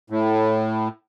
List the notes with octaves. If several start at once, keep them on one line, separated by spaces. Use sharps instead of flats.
A2